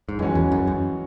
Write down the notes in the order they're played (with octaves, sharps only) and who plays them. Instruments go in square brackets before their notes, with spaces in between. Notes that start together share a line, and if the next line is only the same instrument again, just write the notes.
[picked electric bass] G#2
[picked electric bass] F#2 [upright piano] E3 G#3 C#4 F#4
[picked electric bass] E2
F#2
F#2